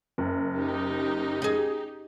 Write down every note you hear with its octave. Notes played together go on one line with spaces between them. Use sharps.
F#1
D#4 G4
G#4 D#5